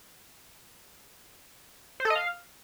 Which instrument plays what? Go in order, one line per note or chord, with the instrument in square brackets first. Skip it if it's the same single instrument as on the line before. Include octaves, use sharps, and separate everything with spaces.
[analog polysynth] C5
A4
D#5
F5